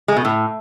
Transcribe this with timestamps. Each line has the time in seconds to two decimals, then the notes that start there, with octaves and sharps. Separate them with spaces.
0.08 G#3
0.16 B2
0.25 A2